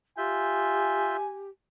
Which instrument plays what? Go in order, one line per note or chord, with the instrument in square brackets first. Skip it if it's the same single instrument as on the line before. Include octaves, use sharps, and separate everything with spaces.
[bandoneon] F4 E5 G6 [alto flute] G4 [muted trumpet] G#5